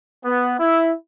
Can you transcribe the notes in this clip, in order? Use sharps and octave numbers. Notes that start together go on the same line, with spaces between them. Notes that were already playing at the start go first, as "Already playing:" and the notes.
B3
E4